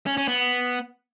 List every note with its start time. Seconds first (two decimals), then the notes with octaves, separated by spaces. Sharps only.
0.06 C#4
0.17 C#4
0.28 B3